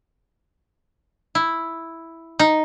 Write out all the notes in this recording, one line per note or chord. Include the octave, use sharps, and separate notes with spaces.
E4
D#4